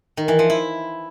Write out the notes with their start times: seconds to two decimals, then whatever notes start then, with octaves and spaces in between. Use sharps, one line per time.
0.17 D#3
0.28 E3
0.39 F3
0.50 E4